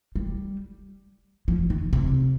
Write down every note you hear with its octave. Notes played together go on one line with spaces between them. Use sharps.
G3
F3
D#3
C3